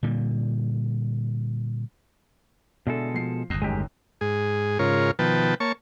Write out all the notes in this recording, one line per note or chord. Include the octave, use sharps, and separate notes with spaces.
A#2 D3 G3
B2 D3 G#3 D4 E4 A4
F3 C7
G1 E2 D#6 A#6 C7
A1 F#2 D#3 G#3 G4
G#2 G#4
G#2 C#3 F4 A#4 C#5
B2 D#3 F3 B4 G5 A5
A#3 C#5 A5 C#6